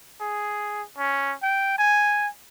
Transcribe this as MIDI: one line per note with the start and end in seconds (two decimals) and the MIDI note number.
0.21 0.83 68
0.98 1.33 61
1.43 1.74 79
1.78 2.28 80